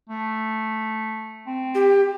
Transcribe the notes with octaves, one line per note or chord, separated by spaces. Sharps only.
A3
C4
G4